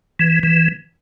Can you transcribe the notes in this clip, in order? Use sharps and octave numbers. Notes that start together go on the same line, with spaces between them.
E3
E3